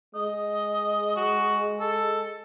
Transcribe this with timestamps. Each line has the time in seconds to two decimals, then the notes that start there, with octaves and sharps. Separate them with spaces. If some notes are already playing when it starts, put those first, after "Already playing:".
0.15 G#3 D#5
1.16 F#4
1.80 A4